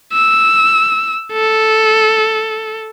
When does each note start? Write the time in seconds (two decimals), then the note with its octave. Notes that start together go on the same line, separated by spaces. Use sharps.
0.13 E6
1.33 A4